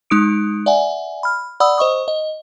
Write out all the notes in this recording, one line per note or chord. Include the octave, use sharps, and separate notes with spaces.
G#3 D#4 D#6 D7
D5 E5 F#5 G#5
B5 F6
D5 F#5 B5 D#6 E6
C5 D#5 C#6 D#6
D#5